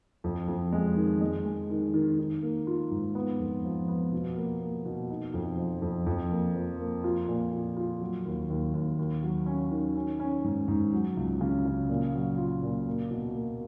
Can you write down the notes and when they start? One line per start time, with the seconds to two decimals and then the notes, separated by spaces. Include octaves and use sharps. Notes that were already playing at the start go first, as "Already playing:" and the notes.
0.24 F2
0.48 F2
0.73 G#3
0.96 D#3
1.21 G#3
1.45 G#3
1.70 D#3
1.94 D#3
2.18 D#3
2.43 A#3
2.67 F4
2.91 G#2
3.15 B3
3.40 F2
3.65 F3
3.88 B3
4.12 B2
4.37 A#3
4.61 A#3
4.85 B2
5.10 D#4
5.34 F2
5.58 F3
5.82 F2
6.06 F2
6.31 A#3
6.55 F3
6.79 A#3
7.04 F4
7.28 A#2
7.53 F4
7.77 F4
8.01 F#3
8.25 D#2
8.50 D#2
8.74 D#2
8.99 D#2
9.23 F#3
9.46 C#4
9.71 D#3
9.96 C#4
10.20 C#4
10.44 G#2
10.68 G#2
10.93 F#3
11.17 C#2
11.41 C#3
11.65 C#3
11.89 A#2
12.14 F#3
12.38 F4
12.63 A#2
12.87 A#3
13.11 B2
13.35 A#3